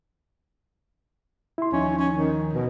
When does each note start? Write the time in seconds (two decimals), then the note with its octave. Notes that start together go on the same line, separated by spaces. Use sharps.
1.58 E4 C6
1.72 D#2 F3 C#4 D#4
1.98 C#4
2.14 D#3
2.53 B2